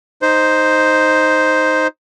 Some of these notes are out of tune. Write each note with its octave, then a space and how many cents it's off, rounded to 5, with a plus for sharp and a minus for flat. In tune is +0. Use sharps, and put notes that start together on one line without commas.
D#4 +0 C5 +0